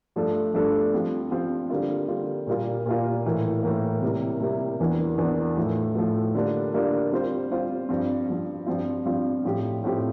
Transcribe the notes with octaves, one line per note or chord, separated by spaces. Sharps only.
G2 F3 A3 D4 A4
G2 F3 A3 D4 A4
F3 C4 G4
F3 C4 G4
D3 G3 A#3 F4
D3 G3 A#3 F4
A#2 G3 A#3 F4
A#2 G3 A#3 F4
A2 E3 A#3
A2 E3 A#3
C3 G3 A#3 E4
C3 G3 A#3 E4
E2 E3 A#3 D4
E2 E3 A#3 D4
A2 F3 A3
A2 F3 A3
D3 G3 A#3 D4 F4
D3 G3 A#3 D4 F4
G3 C4 F4 C5
G3 C4 F4 C5
G2 F3 C4
G2 F3 C4
G2 F3 C4 F4
G2 F3 C4 F4
A2 F3 C4 G4
A2 F3 C4 G4